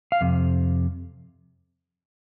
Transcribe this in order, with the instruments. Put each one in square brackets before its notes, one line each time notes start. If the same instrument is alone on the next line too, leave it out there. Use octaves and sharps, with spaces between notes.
[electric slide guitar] F5
F2 C3